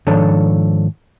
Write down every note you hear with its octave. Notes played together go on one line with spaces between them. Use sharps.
G#2 D#3 F3 D4 A4 C#5